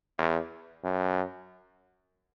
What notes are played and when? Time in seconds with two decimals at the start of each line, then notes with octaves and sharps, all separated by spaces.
0.18 E2
0.84 F#2